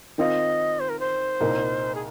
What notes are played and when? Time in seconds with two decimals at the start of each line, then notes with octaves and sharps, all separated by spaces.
0.18 D#3 C4 F4 D#5
0.80 C5
0.89 A#4
0.99 C5
1.40 C2 A#2 A#3 D#4
1.95 G#4